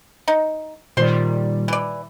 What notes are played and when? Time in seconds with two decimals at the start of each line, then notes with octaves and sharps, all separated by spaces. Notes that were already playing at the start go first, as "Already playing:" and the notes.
0.28 D#4
0.97 A#2 D#3 G3 C5 C6
1.68 E3 D5